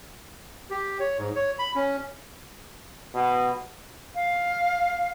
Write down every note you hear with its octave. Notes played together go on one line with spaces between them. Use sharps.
G4
C#5
G#2
C#5
B5
C#4
B2
F5